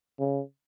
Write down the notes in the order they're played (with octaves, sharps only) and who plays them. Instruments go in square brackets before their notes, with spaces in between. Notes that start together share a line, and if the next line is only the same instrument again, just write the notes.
[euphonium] C#3